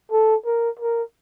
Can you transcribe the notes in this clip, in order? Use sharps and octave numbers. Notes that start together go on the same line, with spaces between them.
A4
A#4
A#4